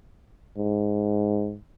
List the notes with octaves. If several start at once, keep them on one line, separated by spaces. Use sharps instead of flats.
G#2